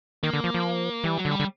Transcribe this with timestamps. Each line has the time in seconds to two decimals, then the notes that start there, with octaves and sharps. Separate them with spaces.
0.23 D#3 A#3
0.33 D3
0.44 F3
0.54 F3
1.04 E3 G3
1.17 F#3
1.25 D3
1.31 G3
1.40 D3